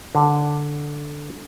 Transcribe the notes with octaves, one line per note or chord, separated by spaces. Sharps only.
D3